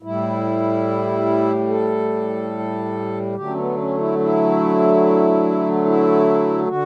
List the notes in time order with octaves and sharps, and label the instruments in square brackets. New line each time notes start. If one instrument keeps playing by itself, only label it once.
[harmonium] A2 G3 E4
A4
D3 F#3 A3 G4
C#4
B3
C#4
E4
E4
E4
D3 F#4